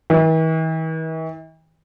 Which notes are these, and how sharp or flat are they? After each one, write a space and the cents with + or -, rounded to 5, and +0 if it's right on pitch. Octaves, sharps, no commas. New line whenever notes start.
E3 -45